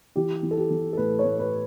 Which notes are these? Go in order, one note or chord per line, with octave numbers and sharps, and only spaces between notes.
E3 G4
E3
A4
G4
E3
A4
A2 B4
C#5
A2
B4